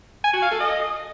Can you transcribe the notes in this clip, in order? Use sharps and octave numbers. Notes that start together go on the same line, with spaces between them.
G#5
F#4
F5
A4
D#5